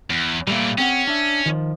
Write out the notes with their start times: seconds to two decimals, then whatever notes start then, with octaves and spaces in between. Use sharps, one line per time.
0.10 E2
0.47 A#2 E3 G3 A3 A#3
0.78 C4 C#4 G#4 F#5
1.07 D4 E5
1.46 D#3 F3